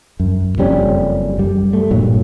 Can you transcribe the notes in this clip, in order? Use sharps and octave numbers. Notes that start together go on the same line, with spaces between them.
F#2
F#1 F2 G3 C#4
F#2 G3
A3
G2 A#2 F#3